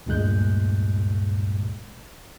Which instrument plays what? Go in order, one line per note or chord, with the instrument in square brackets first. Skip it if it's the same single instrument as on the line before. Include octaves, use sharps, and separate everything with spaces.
[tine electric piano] D2 G2 A#2 G#3 F#6 G6